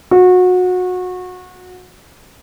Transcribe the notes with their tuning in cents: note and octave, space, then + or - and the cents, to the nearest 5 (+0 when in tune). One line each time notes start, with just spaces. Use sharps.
F#4 -25